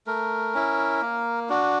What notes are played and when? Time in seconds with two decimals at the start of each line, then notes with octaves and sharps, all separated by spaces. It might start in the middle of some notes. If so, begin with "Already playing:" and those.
0.07 A3 A#4
0.54 C#4 E4
1.02 A#3
1.49 D4 F#4